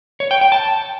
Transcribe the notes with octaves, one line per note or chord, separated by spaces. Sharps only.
C#5
G5
G5
A5